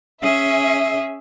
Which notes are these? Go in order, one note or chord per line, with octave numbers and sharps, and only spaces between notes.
C#4 G#4 E5